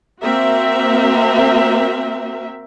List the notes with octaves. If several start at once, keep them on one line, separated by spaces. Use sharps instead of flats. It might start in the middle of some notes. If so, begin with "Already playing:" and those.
A#3 C4 F#4 A#4 E5